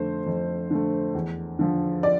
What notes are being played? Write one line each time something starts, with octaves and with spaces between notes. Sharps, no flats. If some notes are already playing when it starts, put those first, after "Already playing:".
Already playing: F2 D3 A3 C5
F2
D3 A3
E2
D3 F3
D5